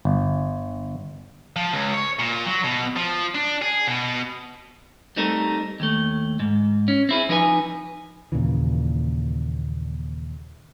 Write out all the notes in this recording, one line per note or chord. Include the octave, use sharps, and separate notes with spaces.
G1
F3
C#2
C#5
A#2
F#3
B2
F3
D4
G#4
B2
G3 A3 C4 D#4 A4 A#4
D#2 A3
G#2
C#4
C4 E4 G#4
F3 D#4 B4 D#5 G#5
D#2 A#2 C#3 E3